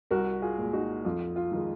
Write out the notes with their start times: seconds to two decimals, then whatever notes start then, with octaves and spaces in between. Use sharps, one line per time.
0.11 C2 F#4 A#4
0.42 F4 G#4
0.58 A#2 G#3
0.73 D#4 F#4
1.05 F2 F4
1.36 F4
1.52 D#3 G#3